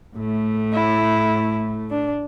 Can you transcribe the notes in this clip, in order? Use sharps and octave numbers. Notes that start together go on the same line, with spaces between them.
A2 A3
E4
D4